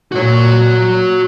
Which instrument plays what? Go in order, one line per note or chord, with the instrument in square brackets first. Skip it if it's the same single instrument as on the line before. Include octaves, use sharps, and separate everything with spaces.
[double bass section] A#2 [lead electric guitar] F#4 C#5